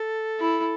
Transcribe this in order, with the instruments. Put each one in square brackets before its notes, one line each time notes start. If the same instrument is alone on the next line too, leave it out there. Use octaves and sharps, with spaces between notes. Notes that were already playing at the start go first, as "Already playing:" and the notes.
Already playing: [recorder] A4
[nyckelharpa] E4